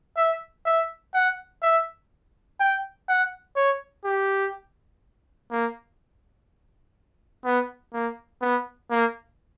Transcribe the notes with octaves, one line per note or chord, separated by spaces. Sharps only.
E5
E5
F#5
E5
G5
F#5
C#5
G4
A#3
B3
A#3
B3
A#3